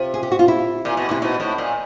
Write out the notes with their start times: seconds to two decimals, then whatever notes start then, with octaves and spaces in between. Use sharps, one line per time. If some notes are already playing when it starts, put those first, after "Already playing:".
Already playing: C3 F4
0.14 G#4
0.23 G4
0.32 F#4
0.39 F4
0.48 E4
0.85 A#2
0.97 B2
1.09 C3 E4
1.22 B2 D#4
1.40 A2
1.58 A#2